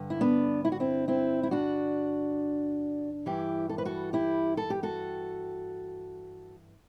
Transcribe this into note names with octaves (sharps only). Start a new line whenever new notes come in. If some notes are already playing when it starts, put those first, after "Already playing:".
Already playing: G2 D3
E4
B3 D4
E4
F#4
C4 E4
C4 E4
E4
D4 F#4
G2 E3 E4 G4
A4
B4
F#4 A4
E4 G4
A4
G4
F#4 A4